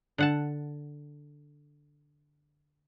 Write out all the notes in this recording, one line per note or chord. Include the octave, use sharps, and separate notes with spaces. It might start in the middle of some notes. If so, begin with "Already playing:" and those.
D3 F#5 A5